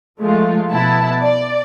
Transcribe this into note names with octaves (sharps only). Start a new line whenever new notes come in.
F3 G#3 A3 F4
B2 B3 E4 A5
D5